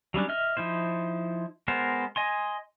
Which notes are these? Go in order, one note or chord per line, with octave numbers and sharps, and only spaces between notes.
F#3 G3 C#4 D4
D#5 E5 F6
F3 D#4 E4 C5
G#3 B3 A#4 C5
D#5 G#5 C6